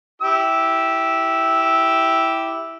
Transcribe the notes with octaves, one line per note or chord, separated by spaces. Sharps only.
E4 G4 E6